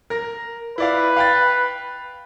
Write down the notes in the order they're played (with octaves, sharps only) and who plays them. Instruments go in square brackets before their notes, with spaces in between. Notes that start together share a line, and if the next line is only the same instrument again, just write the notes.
[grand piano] A#4 A#6
[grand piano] E4 D5 F5 [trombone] B4
[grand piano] F5 G5 A6